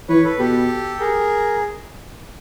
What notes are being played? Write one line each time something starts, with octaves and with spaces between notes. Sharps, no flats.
E3 B4 C#5
A4 B4
B2 G4 A4
G#4 A#4